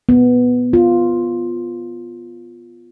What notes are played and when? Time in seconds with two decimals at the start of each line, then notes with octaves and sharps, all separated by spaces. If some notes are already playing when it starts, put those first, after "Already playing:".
0.09 B3
0.73 F4